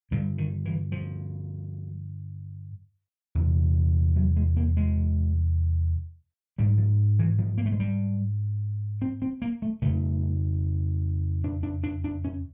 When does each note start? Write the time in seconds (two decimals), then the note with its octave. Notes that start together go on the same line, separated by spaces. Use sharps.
0.11 G2 D3 G3
0.38 D#3
0.65 E3
0.92 F3
3.35 E2 C3
4.16 F#3
4.36 G#3
4.56 A#3
4.77 G#3
6.58 G#2 G3
6.78 F3
7.19 E3
7.39 F3
7.58 A#3
7.66 A3
7.72 G#3
7.80 G3
9.02 C4
9.22 C4
9.42 A#3
9.62 A3
9.82 F2 C#3 A3
11.44 D4
11.63 D4
11.83 D4
12.04 D4
12.24 C#4